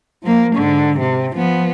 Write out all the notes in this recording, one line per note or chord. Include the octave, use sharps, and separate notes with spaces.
F3 A#3
G#2 D3
C3
F3 B3